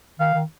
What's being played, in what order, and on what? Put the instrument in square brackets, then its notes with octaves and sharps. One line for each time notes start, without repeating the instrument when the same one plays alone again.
[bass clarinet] D#3 [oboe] F5
[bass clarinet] D#3